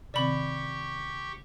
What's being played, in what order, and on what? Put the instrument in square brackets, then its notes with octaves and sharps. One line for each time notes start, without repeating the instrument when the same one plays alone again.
[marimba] C3 D#3 C4 [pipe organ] G4 C#6 [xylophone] D5 B5